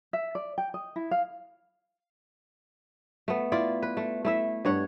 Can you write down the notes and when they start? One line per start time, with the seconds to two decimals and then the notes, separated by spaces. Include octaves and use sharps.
0.13 E5
0.35 D5
0.58 G5
0.74 D#5
0.96 E4
1.11 F5
3.28 A3 B3
3.52 E4 F4 D5
3.83 B4
3.97 A3
4.25 A3 E4 E5
4.65 G2 C#5 F#5